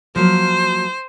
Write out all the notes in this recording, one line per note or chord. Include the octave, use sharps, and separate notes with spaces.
F3 F#3 A#3 C5